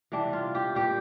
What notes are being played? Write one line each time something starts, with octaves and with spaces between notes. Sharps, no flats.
C3 E3 G3 D4
F4
G4
A#2 G3 G4